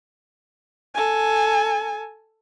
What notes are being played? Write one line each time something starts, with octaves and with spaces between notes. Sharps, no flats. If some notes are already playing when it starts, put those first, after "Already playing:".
A4 G#5